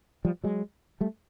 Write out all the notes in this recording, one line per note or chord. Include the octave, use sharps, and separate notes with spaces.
F3 G3
F#3 G#3
G3 A3